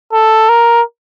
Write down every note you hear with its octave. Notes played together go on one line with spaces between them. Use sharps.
A4
A#4